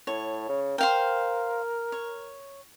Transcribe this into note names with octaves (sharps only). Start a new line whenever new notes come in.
A2 C#5
C#3
A#4 C5 F5 G5
C#5